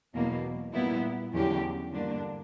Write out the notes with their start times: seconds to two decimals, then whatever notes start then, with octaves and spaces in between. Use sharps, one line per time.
0.13 E2 B2 F#3 A#3
0.73 A#2 G3 B3 E4
1.33 E2 D3 F#3 C#4 G4
1.92 G2 D3 A#3 D4